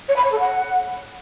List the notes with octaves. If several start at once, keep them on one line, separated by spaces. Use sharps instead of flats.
C#5
B5
C#5
A4
F#5